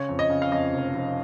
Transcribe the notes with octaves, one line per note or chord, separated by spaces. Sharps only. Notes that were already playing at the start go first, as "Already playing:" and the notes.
Already playing: C#3 C#5
F2
D#5
C#3
F5
F2 D#5
F1
F1